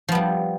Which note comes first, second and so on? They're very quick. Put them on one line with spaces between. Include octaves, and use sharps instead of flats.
F3 B3 G3